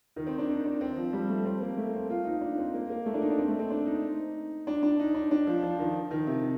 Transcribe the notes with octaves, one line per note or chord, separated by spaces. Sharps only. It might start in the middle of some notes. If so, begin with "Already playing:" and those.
D#3
C4
D4
D#4
D4
C4
F3
G3
A3
C4
A#3
A3
C4
F4
D#4
D4
C4
A#3
A#3
A3
D4
D#4
D4
C4
A3
C4
D4
D#4
D4
D4
D#4
D4
D4
F3
F3
D#3
D#3
C3